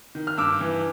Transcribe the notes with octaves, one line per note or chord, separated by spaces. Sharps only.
D#3
F6
G2 D6 E6
E3